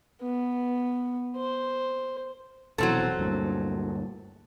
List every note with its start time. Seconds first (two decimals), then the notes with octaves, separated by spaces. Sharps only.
0.21 B3
1.36 C5
2.78 F1 B2 E3 F#3 C4 A4
3.19 D2 G2 A#2